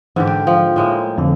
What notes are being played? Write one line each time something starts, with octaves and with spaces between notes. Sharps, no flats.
G#2 D3 E3 G4
G5
F3
A2 G#3 A#3
F2 D3